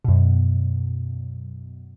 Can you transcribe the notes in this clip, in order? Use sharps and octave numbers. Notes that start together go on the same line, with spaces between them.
F#2 B2